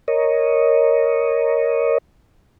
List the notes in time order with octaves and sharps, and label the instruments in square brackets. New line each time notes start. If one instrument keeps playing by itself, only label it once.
[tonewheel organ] A#4 C#5 D#5